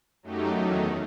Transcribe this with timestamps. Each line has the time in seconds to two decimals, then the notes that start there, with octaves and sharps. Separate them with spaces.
0.23 F#2 F#3 A3 D#4 G4
0.55 E2 D#3 F#3 A3 D#4